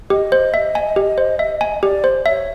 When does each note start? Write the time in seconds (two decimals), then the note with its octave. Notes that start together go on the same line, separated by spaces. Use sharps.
0.10 G4 D#5
0.32 C5
0.54 E5
0.75 G#5
0.96 G4
1.18 C5
1.39 E5
1.61 G#5
1.82 G4 D5
2.04 C5
2.26 C#5 E5